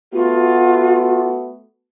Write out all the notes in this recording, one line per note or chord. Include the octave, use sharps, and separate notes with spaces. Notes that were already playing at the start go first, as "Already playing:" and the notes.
A3 B3 F4 F#4